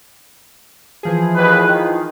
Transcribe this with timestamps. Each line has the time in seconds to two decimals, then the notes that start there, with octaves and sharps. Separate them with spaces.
1.03 E3 F3 G#4
1.35 D#2 B4
1.69 D#3